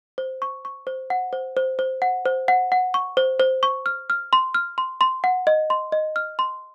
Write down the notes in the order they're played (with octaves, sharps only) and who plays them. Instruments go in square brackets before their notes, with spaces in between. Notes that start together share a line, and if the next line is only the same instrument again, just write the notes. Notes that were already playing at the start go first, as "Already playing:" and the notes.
[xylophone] C5
C#6
C#6
C5
F#5
C5
C5
C5
F#5
C5
F#5
F#5
C#6
C5
C5
C#6
F6
F6
C6
F6
C6
C6
F#5
D#5
C6
D#5
F6
C6